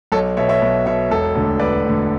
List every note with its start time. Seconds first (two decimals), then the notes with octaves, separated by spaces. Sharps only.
0.12 B1 A4 C#5
0.37 B2 C#5 E5
0.49 C#5 E5
0.62 B1
0.86 B2 C#5 E5
1.11 E1 A4 C#5
1.35 D2 D3
1.59 E1 B4 D5
1.85 D2 D3